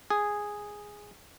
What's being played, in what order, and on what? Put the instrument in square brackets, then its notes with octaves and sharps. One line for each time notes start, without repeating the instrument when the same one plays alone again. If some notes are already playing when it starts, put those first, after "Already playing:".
[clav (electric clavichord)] G#4